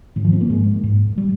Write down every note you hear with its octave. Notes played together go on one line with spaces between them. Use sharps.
G#2 D#3
F3
C4
A#3
G#2 G#3
G#2
G3